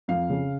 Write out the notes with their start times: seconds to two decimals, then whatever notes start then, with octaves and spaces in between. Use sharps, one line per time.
0.08 F2 F5
0.30 C#3